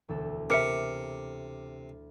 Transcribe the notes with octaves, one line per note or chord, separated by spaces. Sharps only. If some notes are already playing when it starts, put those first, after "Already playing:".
E1 D2 A4
C3 A#4 E5 D6 F6 C#7